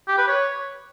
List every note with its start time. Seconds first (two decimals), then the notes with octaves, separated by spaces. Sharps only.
0.08 G4
0.18 B4
0.28 C#5